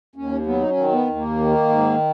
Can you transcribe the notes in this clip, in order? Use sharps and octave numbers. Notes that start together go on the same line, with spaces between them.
D#2 C#4
F#3 B3
D#4
C#4
D#3
B3
D#2
A#3
D#3
G#2